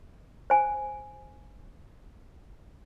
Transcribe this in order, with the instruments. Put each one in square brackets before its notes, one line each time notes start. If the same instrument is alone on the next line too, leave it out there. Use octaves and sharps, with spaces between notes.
[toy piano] C5 G#5